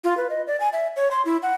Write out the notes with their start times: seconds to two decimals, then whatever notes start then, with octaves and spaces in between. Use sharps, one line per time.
0.04 F4
0.17 B4
0.30 D#5
0.47 D5
0.60 G#5
0.73 E5
0.96 C#5
1.11 C6
1.25 E4
1.43 F#5